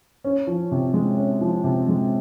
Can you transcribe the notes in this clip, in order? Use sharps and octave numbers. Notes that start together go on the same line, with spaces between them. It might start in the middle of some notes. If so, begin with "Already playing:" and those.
C#4
F3
C3
G#3
C#4
F3
C3
G#3